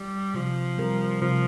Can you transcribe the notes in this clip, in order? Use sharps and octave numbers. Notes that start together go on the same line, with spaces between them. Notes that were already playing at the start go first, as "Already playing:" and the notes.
Already playing: G3
C3 F3
G3 C4 G4 A#4
C3 F3